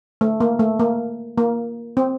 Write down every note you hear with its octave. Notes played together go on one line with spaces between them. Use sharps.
A3
A#3
A3
A#3
A#3
C4